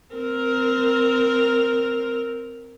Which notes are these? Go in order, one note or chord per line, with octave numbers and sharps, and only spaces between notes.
C4 A#4